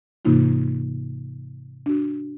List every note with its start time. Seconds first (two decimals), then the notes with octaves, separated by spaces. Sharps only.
0.25 G#2 C3 E3 A#3 D#4 F4
1.86 D4 F#4